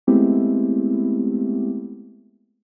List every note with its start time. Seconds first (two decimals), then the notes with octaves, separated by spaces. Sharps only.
0.07 G#3 A3 B3 C4 E4 G4